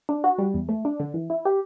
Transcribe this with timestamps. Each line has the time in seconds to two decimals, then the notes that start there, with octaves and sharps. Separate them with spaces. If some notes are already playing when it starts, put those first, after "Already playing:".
0.09 D4
0.24 F#4
0.38 G3
0.54 E2
0.69 A3
0.85 D4
1.00 D3
1.14 E3
1.30 E4
1.45 G4